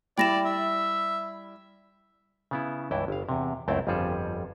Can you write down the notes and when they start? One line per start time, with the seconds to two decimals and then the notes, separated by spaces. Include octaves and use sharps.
0.18 G3 E4 D5 G5 A#6 E7
0.45 E5
2.51 C#3 B3 E4
2.91 C#2 G2 E3 E4 G5
3.08 G1 F5
3.29 E2 C3
3.68 C#2 F#2 A3 C4 E4 G5
3.87 G1 F2 F3 G3 G#4 A4